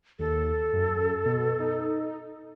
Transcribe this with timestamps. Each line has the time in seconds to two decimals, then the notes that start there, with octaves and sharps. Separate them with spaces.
0.19 D#2 A4
0.73 F#2
1.25 B2
1.60 D#4